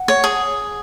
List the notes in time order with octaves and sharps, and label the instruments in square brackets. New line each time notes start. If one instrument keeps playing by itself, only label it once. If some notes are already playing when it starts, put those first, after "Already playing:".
Already playing: [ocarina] F#5
[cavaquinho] C#5
G#4